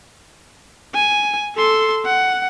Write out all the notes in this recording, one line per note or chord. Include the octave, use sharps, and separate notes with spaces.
G#5
A4 C6
F#5